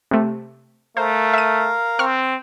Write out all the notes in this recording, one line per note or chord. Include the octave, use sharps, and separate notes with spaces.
C3 A3
A3 A#4 C5 F5
E5 D#7
C4 C#6 F6